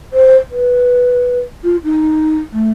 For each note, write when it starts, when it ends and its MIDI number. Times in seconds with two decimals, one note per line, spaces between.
0.13 0.36 72
0.50 1.38 71
1.63 1.76 65
1.83 2.39 63
2.52 2.69 57